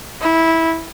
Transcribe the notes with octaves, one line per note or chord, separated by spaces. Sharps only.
E4